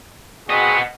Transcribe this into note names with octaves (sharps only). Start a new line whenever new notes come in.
B3 C4 F#4 G#4 D#5